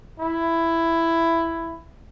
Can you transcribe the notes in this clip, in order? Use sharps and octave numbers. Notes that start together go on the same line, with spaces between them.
E4